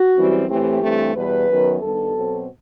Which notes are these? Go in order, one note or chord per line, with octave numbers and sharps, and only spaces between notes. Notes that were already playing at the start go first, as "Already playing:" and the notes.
Already playing: F#4
F#2 E3 G3 C4
A2 E3 A3 C4 G4
G2 E3 A3 C4
E2 B2 G3 B4
F#2 D#3 F#3 B3
G2 D#3 G3 B3 A4
B2 F#3 C4